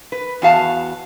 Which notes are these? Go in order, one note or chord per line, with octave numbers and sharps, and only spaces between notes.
B4
E2 F#4 F5 A5